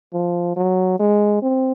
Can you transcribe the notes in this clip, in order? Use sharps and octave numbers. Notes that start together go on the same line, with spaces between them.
F3
F#3
G#3
C4